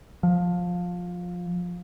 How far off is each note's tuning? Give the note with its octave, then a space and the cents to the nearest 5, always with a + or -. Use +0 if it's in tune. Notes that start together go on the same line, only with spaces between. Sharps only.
F3 +20